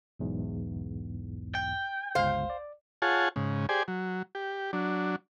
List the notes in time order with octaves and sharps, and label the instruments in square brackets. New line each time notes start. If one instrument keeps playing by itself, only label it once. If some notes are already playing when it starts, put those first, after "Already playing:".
[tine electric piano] B1 E2 G#2
[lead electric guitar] G5
[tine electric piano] G1 C#2 [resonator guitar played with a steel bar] C5 F5
[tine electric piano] D5
[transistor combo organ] F4 G#4 C#5 F#5 G#5 A5
G#2 C#3
G4 G#4 C5 D5 G#5
F#3
G4
F#3 D4